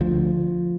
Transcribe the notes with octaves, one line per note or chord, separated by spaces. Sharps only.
D2 F3